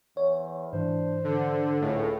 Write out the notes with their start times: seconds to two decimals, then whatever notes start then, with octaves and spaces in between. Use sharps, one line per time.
0.17 E2 C#5
0.73 G#2 E3 D4 C5
1.24 D3 D4
1.81 C#2 A2